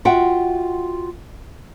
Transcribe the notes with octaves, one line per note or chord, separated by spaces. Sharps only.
F4 F#4 E5 F#5 G5